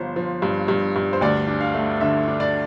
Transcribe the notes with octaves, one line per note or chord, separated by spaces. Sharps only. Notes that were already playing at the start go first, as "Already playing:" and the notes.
Already playing: G1 F3 C5
F3
G2
G2
G2
C5
D2 D5
D4
F5
A3
D3 E5
D4
D5